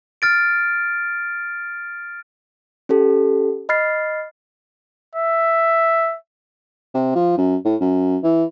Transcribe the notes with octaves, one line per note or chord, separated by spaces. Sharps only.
F6 A6 D7
C#4 G4 A4
D#5 B5 F6 A6 C7
E5
C3
F3
F#2
A2
F#2
E3